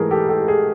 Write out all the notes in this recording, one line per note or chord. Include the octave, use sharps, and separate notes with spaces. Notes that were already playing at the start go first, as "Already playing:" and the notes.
Already playing: G#2 E3 A3 G#4 A#4
G4 A4
G4 A4
G#4